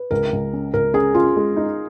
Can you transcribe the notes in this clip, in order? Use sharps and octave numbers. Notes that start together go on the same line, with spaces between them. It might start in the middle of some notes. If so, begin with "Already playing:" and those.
Already playing: B4
C#2 A#4
C#2
C#4
C#2 A#4
C#4 G#4
C#4 F4
G#3
D#4